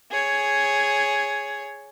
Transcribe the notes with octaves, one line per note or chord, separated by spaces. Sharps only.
G#4 C#5